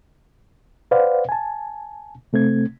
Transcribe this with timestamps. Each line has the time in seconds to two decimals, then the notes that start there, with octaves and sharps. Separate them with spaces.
0.91 B4 C5 D5 F5 F#5
1.29 G#5 A5
2.33 C3 A3 C4 G#6